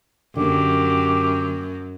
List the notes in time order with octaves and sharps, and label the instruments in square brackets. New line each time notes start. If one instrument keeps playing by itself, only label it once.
[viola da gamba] F#2 [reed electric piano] D3 A#3 [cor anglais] G4